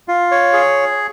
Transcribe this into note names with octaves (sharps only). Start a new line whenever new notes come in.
F4
C#5
G#4